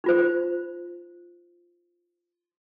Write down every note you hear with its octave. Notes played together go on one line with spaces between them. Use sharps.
D#4 F4 C5